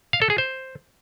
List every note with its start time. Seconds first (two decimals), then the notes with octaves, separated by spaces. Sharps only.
0.13 F5
0.22 A4
0.30 G#4
0.38 C5